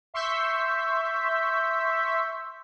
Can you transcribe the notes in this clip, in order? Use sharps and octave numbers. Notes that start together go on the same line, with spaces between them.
E5 C6 C#6 E6 G6 B6